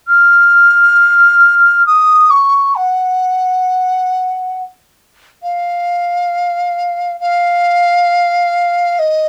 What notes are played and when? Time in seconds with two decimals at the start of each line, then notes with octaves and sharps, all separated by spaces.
0.07 F6
1.86 D#6
2.30 C#6
2.75 F#5
5.42 F5
7.20 F5
8.98 D#5